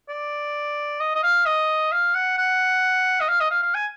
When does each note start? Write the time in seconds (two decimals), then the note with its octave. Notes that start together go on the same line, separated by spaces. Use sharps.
0.09 D5
1.00 D#5
1.15 D#5
1.23 F5
1.46 D#5
1.92 F5
2.14 F#5
2.38 F#5
3.20 D#5
3.29 F5
3.41 D#5
3.51 F5
3.63 F5
3.75 G#5